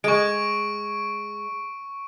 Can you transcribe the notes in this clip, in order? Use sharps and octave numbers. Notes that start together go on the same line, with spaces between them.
G#3 C#6 D7